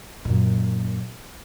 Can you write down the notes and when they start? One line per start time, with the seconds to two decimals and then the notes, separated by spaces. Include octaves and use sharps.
0.25 F#2 A#2